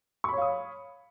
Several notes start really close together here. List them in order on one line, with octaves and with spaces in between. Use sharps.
C#6 B5 C#5 F5 D#6